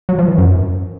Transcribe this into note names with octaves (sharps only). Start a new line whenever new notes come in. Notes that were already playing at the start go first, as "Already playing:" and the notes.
F#3
F3
E3
F#2